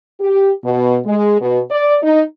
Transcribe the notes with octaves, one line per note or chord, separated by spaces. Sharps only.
G4
B2
G#3
B2
D5
D#4